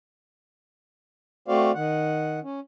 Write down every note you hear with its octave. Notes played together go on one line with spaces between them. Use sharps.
A3 C4 F#4 C5 D5 F5
D#3 F#5
C#4